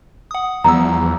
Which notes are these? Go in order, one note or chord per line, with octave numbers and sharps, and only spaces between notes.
F#5 D#6
E2 F3 G3 B3 A#5 E6